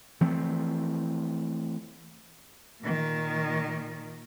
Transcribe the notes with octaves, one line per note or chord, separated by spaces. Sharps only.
E3 F3 A3 C4
A#2 D#3